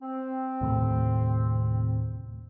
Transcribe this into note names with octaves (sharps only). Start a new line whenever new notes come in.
C4
D#2 A2 C3